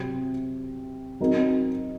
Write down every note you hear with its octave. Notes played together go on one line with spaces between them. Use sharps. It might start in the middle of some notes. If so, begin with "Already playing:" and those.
Already playing: C3 F#3 C4
F#3 C4 D#4 A#4